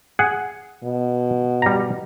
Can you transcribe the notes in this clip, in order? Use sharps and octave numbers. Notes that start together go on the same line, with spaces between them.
G#4 F#5
B2
G3 A#5